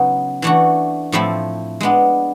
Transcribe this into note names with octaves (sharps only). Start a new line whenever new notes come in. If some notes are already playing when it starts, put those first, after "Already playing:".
Already playing: C#3 F#3 B3 D#4
E3 A3 D4 F#4
A2 F3 A3 C4 E4
G#3 B3 D4